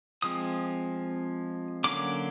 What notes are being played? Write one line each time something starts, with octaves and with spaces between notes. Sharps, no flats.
F3 G#3 C4 D#6
D3 F#3 A#3 C#4 D6